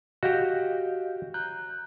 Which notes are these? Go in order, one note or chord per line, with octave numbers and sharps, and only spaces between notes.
F#4 G4 D#5 F5 G6
A#5 F#6 G6